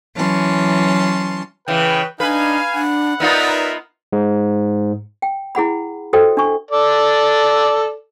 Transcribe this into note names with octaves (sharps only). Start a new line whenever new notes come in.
E3 F#3 C#4 A5 C6
C#3 E3 B4 G5
D4 D#4 B4 F5 G#5
D4 F#5
B3 D#4 F4 A#4 B4 D5 E5
G#2
G5
E4 G#4 F#5 B5
F#4 A4 C5 D#5 G5
D4 C#6
A4 D5